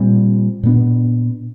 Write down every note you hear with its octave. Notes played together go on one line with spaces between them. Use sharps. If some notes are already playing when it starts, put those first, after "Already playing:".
Already playing: A#2 G3 C4
A#2 G3 B3 D4